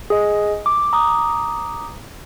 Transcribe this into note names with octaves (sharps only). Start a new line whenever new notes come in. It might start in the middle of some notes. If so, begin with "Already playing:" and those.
G#4 D#5
D6
A#5 D6 D#6